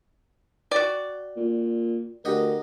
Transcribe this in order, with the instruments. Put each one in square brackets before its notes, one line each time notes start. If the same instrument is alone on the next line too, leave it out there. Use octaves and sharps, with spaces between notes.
[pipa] F#4 D5 [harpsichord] G5
[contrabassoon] A#2
[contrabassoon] D2 [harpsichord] G4 D#5 F#5 [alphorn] A#4